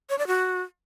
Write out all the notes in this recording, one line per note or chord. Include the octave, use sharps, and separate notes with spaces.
C#5
D5
F#4